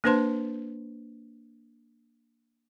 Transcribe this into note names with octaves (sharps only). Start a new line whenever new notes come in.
A#3 D4 B4 C5 A5 C6